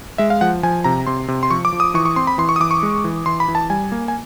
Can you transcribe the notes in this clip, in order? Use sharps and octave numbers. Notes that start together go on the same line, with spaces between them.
G#3 E5
F5
F3 F#5
F3 G#5
C3 A#5
C3 C6
C3
C6
F3 C#6
D6
F3
D#6
E3 C#6
C#6
C4 C6
B5
E3 C6
C#6
D#6
E3 D6
C#6
G#3
E3
E3 C6
B5
E3
A5
G3 G#5
A#3
G#5